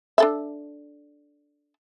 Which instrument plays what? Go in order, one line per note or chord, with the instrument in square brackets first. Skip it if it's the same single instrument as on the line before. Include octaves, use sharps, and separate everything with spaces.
[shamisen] D4 A4 E5